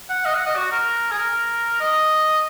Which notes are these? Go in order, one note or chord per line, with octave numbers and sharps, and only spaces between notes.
F#5
D#5
F#5
D#5
F#4
A#4
G#4
A#4
D#5